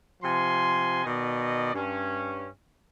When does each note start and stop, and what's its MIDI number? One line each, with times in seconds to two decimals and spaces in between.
0.23 1.03 48
0.23 1.03 53
0.23 1.03 80
0.23 1.03 84
1.05 1.73 47
1.05 1.73 51
1.05 1.73 74
1.05 1.73 75
1.74 2.47 43
1.74 2.47 61